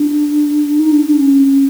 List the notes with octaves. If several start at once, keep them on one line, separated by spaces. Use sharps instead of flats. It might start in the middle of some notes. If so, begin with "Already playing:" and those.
Already playing: D4
D#4
D4
D4
C#4
C#4